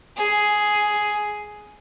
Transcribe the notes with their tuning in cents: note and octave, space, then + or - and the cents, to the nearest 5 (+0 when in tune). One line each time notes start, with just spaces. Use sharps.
G#4 +5